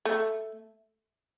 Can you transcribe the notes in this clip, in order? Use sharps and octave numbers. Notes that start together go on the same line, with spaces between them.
A3